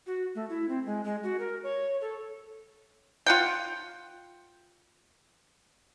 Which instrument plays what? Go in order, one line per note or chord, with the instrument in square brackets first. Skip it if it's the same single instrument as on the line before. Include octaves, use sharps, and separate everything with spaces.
[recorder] F#4
A3
E4
C4
G#3
G#3
F#4
A#4
C#5
A4
[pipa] F4 F#5 G5